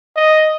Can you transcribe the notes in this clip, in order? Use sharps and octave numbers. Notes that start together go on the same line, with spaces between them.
D#5